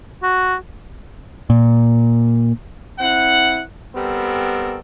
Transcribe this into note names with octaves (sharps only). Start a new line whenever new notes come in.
F#4
A#2
C4 E4 F#5
G3 B3 C4 A4 A#4